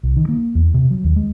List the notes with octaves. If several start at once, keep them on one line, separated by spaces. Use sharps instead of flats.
C2
D#3
A#3
E2
C3
F#3
D#2
G#3